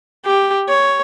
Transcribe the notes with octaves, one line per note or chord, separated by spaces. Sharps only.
G4
C#5